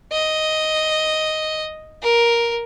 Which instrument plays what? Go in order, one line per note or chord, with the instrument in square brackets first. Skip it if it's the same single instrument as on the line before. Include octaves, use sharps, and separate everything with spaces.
[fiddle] D#5
A#4